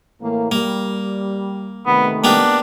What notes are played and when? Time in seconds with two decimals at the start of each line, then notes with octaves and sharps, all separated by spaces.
0.20 A2 E3 A#3
0.52 G3 A#3
1.87 C3 D#3 A3 B3
2.24 A#3 B3 D4 G4